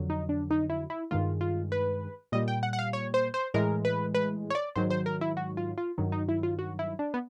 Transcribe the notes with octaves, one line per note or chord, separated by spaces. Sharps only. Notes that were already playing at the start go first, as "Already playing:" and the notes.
Already playing: F2 D3 F#3
D#4
D4
D#4
E4
E4
G2 D#3 G#3 F4
F4
B4
A#2 G3 D#5
G5
F#5
F#5
F5
C#5
C5
C5
A2 E3 G#3 A#4
B4
B4
C#5
D5
G#2 D#3 F#3 C5
C5
A#4
E4
F#4
F4
F4
G2 D#3 F#3
D#4
E4
F4
F#4
E4
D4
B3